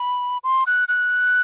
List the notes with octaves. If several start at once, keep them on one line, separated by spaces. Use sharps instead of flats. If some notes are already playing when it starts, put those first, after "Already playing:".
Already playing: B5
C6
F#6
F#6